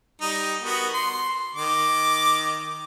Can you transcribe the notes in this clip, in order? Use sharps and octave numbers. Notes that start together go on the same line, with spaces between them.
G3 D#4
B3 F#4 A#4
C6
D#3 D6